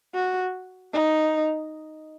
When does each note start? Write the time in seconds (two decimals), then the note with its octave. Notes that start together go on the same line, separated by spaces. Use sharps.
0.14 F#4
0.93 D#4